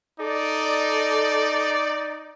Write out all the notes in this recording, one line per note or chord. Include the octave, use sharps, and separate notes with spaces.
D#4 A4 D5